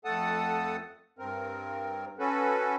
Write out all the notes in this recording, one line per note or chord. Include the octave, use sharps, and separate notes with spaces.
F2 A3 A4 F#5 A5 D#6
G2 C4 A#4
C#4 F#4 A4 B4